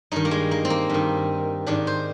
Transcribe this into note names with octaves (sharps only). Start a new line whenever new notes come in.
G2 D#3 D#4
A#3
G#3
A#3
C4
A#3
G2 D#3
G#2 D#3 D4
C5